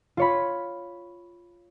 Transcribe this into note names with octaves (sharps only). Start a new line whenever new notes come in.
F4 C#5 B5